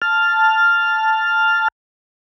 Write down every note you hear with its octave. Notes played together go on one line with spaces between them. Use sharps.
A5 F6